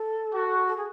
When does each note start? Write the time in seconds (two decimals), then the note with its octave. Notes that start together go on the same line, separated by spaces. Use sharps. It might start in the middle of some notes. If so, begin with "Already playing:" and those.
Already playing: A4
0.34 F#4
0.67 A4
0.77 G#4